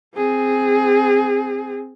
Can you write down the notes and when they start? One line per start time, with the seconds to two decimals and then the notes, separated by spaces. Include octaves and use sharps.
0.16 C4 G#4